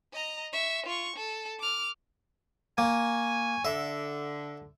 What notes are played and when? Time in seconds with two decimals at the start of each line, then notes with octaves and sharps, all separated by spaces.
0.13 D#5 A#5
0.53 E5 C#6
0.86 F4 C#6
1.16 A4
1.59 D6 F6
2.78 A#3 C#5 G#5
3.65 D3 E5